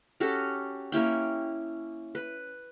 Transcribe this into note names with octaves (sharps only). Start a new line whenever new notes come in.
C#4 F#4 G4 A4
A#3 C#4 E4 G5
B4